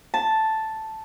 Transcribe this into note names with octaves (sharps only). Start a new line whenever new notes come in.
A5